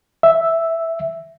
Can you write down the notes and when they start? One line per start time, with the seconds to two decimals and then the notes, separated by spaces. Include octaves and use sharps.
0.23 E5